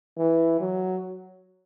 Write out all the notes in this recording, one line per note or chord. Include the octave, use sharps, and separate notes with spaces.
E3
F#3